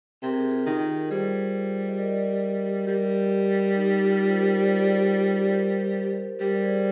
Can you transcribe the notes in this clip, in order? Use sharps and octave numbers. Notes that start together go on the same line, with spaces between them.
C3 A#4
G#4
G4
F4 G#4
D#3
G3 G#4 C5
D#5
A#4 D5
G3 G4 A#4
D#4 G4
F4
C5
A#4 D5
C5
D5
G#4 C5
C5
G4 A#4
G3 G4 A#4
D5
G#4 C5